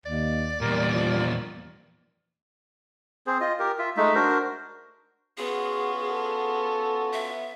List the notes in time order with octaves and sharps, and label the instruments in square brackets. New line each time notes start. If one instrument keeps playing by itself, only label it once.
[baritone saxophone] D#2 [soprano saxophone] D5
[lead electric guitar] E2 A#2 [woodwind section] G3 A#4
[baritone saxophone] F3
[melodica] C4 G#4 C5
F4 D#5
G4 A#4
F4 E5
G#3 A3 D#4 E5
D4 F#4 A#4 C5
[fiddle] B3 [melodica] C#4 F4 F#4 [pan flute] G#4
[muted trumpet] A4
[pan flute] E5